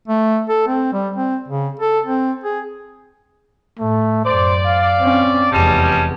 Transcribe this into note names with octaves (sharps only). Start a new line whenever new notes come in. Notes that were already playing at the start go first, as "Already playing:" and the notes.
A3
A4
C4
G3
C4
C#3
A4
C4
G#4
A2 A3
F#2 C5 D5
F5
C4 C#4
F1 E2 G3 G#3 C#4 A5